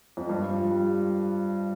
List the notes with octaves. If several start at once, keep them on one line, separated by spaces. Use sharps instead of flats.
F2
G2
F3
G3